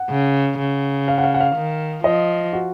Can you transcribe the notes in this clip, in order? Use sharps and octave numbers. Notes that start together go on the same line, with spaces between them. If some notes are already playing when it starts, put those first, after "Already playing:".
Already playing: F#5
C#3
C#3
F5
F#5
F5
F#5
F5
D#3
F3 D#5
F#4